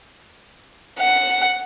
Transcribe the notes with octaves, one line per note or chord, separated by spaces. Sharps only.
F#5